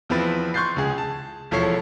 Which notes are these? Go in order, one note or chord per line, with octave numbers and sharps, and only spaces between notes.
E2 F3 C4 E4 B4 A6
C6 C#6 F#6 G6 A6 C7
C#2 G#4
A5
E1 F3 E4 A4 C#5 C7